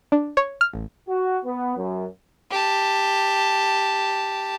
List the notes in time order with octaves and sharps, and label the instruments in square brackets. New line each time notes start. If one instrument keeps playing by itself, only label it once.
[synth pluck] D4
C#5
F6
A1
[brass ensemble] F#4
B3
F#2
[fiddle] G4 A5